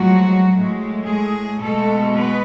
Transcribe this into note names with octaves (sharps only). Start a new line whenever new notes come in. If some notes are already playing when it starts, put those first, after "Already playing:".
Already playing: A2 F3 F#3 G#3 F#4
A2 G#3
G#3 G#4
B2 G#3 A3 A4
B3 B4